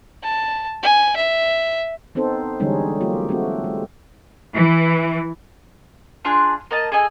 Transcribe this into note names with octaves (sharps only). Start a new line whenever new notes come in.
A5
G#5
E5
B3 C4 D#4 A4 C5
D3 E3 G3 G#3 C#4 D#4
F#3 A#3 F4 G4
A3 C4 F#4
G#3
E3
D4 F4 G#4 F#6
A#3 D#5 A5
G#4 A4 D#5 G#5